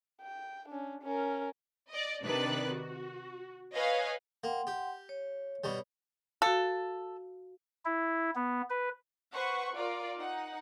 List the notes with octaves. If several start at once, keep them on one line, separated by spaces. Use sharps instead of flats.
G5
C#4 D4
C#4 A#4
D5 D#5
C3 D#3 D4 B4 D5 F#6
F#4
B4 C#5 D#5 F5 G#5
A#3 F#5 G5 C6
G4
C#5
B2 G3
F#4 A4 F5
E4
B3
B4
B4 C5 F#5 C#6
F4 A#4 D5
D#4 F#5